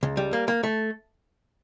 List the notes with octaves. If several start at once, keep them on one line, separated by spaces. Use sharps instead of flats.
C#2
G3
A#3
A#3
A3